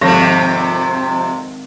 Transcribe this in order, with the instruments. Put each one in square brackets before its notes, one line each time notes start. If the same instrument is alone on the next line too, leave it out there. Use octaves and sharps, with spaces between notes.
[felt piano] G#1 C#6 A#6 [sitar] F2 C3